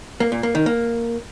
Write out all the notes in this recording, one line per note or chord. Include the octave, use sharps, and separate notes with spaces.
A#3
A#2
A#3
D#3
A#3